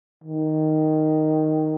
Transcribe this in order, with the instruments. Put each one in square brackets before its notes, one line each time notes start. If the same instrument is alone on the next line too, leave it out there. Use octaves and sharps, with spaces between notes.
[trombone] D#3